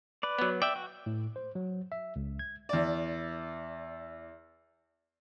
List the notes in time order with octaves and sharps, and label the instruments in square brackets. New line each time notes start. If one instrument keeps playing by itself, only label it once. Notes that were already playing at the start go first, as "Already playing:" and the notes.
[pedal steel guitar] B4 D5
[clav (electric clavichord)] F#3 B3
[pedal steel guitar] D5 E5 [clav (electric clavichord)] G5
[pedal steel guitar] F#4
[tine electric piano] A2
C5
F#3
E5
C#2
G#6
[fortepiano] E2 D5